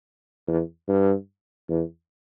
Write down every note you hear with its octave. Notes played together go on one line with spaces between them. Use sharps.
E2
G2
E2